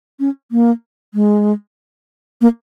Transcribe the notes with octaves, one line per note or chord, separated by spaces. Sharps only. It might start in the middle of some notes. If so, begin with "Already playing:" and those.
C#4
A#3
G#3
A#3